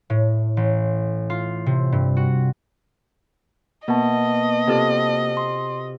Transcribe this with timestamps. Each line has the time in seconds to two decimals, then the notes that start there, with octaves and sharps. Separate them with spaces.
0.10 A2
0.57 A1
1.30 F4
1.66 C3
1.92 G2
2.17 F#4
3.88 B2 A#3 D#5 A5
4.67 C3 F4 A4
5.37 C6